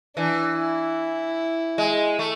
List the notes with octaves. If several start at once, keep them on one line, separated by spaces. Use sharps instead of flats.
E3 D4
E4
G#3
A3